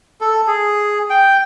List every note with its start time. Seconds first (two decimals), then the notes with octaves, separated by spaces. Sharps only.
0.21 A4
0.47 G#4
1.10 G5